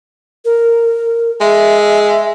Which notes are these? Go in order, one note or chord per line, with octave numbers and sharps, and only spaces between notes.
A#4
G#3 E5